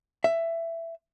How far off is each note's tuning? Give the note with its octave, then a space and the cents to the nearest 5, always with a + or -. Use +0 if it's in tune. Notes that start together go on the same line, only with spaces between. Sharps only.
E5 +15